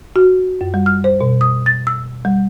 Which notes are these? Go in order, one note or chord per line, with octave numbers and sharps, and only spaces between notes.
F#4
F#2
G3
F6
C5
B2
D#6
A6
E6
G3